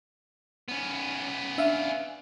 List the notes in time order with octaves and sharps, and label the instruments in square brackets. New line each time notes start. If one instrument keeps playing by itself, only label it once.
[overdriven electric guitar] B3 C#4
[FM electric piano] D4 E5 F5